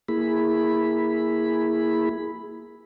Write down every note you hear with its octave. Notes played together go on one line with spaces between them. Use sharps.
A#3 E4 G#4 B5